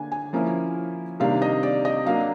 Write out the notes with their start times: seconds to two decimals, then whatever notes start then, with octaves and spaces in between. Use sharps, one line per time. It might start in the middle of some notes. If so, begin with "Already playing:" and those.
Already playing: D3 A#3 D4 G#5
0.12 G#5
0.33 F3 A#3 C#4 E4
1.20 C3 D#3 G3 A#3 D4 F5
1.42 D#5
1.63 D5
1.85 D#5
2.06 F#3 A#3 D4 F5